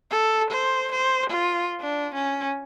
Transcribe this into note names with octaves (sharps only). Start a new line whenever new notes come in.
A4
C5
C5
F4
D4
C#4